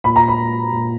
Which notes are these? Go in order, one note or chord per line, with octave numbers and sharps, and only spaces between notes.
A#2 B5
A#5
B5
A#2